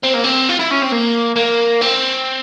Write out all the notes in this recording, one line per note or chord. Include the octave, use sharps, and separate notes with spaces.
C4
A#3
C4
F4
E4
C#4
C4
A#3
A#3
C4